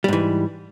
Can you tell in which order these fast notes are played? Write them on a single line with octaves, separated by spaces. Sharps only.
G3 G#2 E3